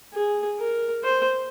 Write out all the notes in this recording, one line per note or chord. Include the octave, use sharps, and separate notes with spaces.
G#4
A#4
C5